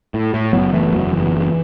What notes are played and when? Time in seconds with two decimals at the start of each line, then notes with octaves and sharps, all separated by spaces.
0.14 A2
0.34 A2
0.53 F#1 F#3 B3
0.73 F#1 E3 A3
0.93 E2 F#3
1.12 F#1 E3
1.32 F#1